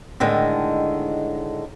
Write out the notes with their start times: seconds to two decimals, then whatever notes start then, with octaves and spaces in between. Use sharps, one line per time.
0.20 A2 D3 D#3 G#3